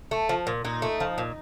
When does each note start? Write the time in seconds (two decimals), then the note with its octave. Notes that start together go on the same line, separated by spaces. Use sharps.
0.11 A3
0.29 F3
0.47 A#2
0.65 A#2 D#4
0.82 A3
1.00 F3
1.18 A#2